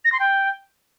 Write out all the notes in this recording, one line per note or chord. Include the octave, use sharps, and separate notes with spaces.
A#6
C6
G5